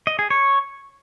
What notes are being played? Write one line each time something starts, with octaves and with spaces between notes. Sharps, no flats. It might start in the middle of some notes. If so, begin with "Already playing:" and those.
D#5
G#4
C#5